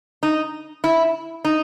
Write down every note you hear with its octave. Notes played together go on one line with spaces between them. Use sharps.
D#4
E4
D#4